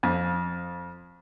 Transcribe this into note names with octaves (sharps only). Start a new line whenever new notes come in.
F2